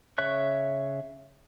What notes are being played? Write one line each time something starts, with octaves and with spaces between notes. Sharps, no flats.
C#3 C#5 E5 C#6 F#6